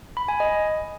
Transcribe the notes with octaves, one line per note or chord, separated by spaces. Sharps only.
B5
G#5
D#5